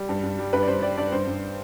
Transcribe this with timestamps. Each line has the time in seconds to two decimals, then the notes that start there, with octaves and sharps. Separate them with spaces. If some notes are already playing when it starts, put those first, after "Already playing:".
Already playing: G3
0.09 G2
0.23 G2
0.39 G3
0.53 G2 B4
0.63 D5
0.68 G2 C5
0.82 G3 D5
0.97 G2 D5
1.12 G2 C5
1.27 G2